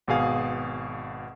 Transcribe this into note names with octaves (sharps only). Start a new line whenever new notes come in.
G#1 B2 G#4 F5